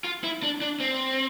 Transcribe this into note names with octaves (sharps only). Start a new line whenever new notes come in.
F4
E4
D4
D4
C4